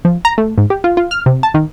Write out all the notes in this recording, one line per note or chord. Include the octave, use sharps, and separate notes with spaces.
F3
A#5
A3
G#2
G4
F4
F4
F6
C3
A5
D#3